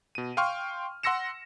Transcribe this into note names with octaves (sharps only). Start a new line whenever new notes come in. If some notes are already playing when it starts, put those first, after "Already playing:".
B2 D#7
F5 G5 C6 C#6 F6
F#5 C6 E6 A#6 C#7 E7